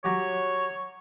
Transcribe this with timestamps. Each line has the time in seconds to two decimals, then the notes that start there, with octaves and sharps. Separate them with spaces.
0.04 F#3 F#4 G4 C#5